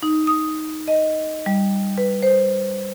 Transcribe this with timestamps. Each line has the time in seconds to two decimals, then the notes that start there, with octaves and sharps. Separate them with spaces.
0.03 D#4
0.27 D#6
0.88 D#5
1.46 G3
1.98 B4
2.22 C5